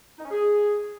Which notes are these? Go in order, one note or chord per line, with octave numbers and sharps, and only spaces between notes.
D#4
C#4
G#4